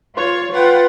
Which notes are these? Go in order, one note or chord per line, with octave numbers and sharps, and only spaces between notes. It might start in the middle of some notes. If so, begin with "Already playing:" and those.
F4 C#5
F4 B4 F#5 G5